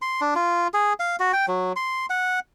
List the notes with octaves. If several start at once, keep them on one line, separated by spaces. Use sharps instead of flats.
C6
D4
F4
G#4
F5
F#4
G5
F#3
C6
F#5